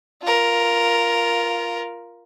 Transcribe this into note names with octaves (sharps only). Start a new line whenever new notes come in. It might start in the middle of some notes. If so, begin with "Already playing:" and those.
F4 A#4